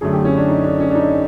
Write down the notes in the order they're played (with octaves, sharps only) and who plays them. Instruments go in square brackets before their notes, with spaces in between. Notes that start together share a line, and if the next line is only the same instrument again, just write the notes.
[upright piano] F#2 D3 F#3 A3 G#4
G4
C#4
D4
D#4
D4
C#4
D4
D#4